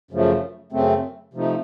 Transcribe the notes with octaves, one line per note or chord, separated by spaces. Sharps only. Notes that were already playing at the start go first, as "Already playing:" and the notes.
F#2 C#3 F3 A3
F#2 C#3 A3 C4
C3 F3 A3 D#4